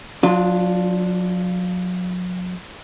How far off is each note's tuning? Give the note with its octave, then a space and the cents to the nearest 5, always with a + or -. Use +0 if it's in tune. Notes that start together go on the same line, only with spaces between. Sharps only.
F#3 -35 D4 +0 F4 +0